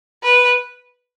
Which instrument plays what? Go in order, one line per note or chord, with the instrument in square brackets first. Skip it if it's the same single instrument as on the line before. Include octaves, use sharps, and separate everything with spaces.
[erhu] B4